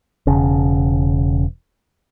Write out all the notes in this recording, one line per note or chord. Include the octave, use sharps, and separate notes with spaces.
E1 C#3